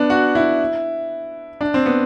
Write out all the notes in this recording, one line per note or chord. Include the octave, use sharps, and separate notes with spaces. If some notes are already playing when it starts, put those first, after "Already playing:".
Already playing: B3 D4
F#4
E4
D4
C4
B3